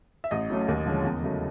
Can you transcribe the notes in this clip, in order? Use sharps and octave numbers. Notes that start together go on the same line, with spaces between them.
E5
A1 D#5
A2 F#3 A3 C#4
D#2
D3 F3 G#3 C#4
E2
C#3 F#3 A3